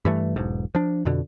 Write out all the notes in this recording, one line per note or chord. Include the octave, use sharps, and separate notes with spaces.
G2 E3 A3
E1 B1 G#2
F3 D4
F2 B2 D3